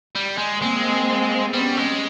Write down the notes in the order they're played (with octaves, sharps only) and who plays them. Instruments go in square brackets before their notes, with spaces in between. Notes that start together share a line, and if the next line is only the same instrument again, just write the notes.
[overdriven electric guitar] G3
G#3
[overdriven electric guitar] G#3 [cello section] A#3 C4
[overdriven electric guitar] G3 [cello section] B3 C#4
[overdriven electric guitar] G#3